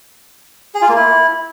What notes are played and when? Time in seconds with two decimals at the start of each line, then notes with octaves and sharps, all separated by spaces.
0.75 G#4
0.82 F4
0.89 A#3
0.96 E4